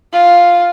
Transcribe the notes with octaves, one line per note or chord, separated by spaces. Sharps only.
F4